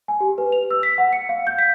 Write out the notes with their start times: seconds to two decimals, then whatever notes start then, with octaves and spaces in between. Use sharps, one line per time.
0.08 G#5
0.21 G4
0.38 B4
0.52 F7
0.71 E6
0.83 B6
0.98 F#5
1.13 C#7
1.29 F5
1.47 G6
1.59 B6